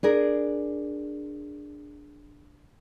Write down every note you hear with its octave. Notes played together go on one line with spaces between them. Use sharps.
D4 G#4 A#4